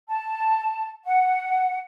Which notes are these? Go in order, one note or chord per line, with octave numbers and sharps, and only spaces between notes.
A5
F#5